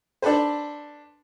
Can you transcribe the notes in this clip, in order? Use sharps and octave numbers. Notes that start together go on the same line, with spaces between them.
D4 A4 B4 C5